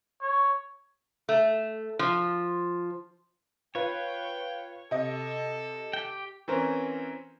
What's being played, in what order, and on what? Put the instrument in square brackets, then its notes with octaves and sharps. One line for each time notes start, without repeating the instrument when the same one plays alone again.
[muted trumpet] C#5
[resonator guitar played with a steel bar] A3
F3
[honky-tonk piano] F4 B4 [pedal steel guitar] C#5 [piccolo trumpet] G5
[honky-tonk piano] C3 D#5 [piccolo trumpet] A4
[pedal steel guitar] G4 G5
[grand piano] E3 C4 C#4 A#4 C5